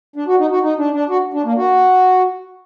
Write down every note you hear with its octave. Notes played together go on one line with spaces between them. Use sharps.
D4
F#4
D#4
F#4
D#4
D4
D4
F#4
D4
A#3
F#4